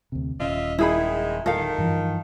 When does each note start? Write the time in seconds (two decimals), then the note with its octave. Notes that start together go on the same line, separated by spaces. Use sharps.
0.12 D2 C3
0.40 D#1 C#4 F4 D#5 E5
0.78 D#3 G#3 E4 G#4 B5
1.46 D1 D#3 A4 F5
1.78 G2 E3 F3